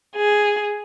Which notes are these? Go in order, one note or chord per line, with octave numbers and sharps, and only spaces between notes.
G#4